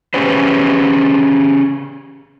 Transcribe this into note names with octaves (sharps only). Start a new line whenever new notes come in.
C#4 G4 G#4 B4 C5